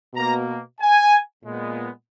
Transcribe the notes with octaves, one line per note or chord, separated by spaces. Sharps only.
B2 A#3 A#5
G#5
A#2 G#3 B3